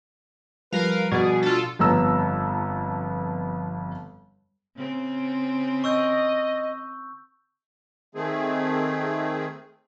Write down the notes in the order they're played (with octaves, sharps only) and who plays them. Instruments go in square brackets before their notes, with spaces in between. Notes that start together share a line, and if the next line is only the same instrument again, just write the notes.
[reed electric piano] F3 G3 [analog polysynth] A#4 F5 [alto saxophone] B4
[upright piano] B2 [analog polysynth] G#4 [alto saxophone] D5
[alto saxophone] D4 [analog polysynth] F4 A4
[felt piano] G1 F2 B3 A#5 E6
[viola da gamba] C#3 C4
[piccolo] D#5 [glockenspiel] C#6 E6 G6
[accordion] D#3 A3 C4 G#4